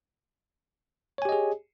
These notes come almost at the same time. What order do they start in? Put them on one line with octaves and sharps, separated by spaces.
C#5 G#5 G4 D#5 G#4